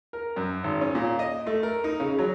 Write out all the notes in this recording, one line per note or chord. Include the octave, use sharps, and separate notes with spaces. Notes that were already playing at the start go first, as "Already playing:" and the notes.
A#4
F#2
G#1
C#4
A#2
D#5
A3
A#4
D#4
C#3
F#3